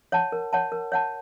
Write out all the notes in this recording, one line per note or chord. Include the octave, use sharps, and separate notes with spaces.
C#5 F#5 A5
A#4
C#5 F#5 A5
A#4
C#5 F#5 A5